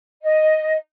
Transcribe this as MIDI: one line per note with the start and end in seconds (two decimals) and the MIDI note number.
0.24 0.76 75